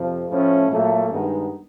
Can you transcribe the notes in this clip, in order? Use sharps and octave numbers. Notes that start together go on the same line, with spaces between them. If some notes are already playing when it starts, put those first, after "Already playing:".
Already playing: F2 C3 F3
A2 F3 A3 C#4
A#2 F#3 A3
G2 D#3 G#3 B3 D#4